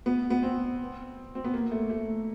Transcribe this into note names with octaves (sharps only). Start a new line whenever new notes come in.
B3
B3
C4
C4
B3
A#3
A3
A3